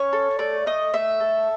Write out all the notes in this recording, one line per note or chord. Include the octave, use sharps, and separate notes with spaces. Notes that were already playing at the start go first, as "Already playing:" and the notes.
Already playing: C#4 C#5
A4
A3 D5
A3 D#5
A3 E5
A4